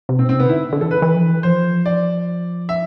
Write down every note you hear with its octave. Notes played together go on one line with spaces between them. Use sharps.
C3
B2 C4
C3 C4
B3
D3 E4
D3
E3 A4
B4
E3
F3
E3
F3 C5
D5
E5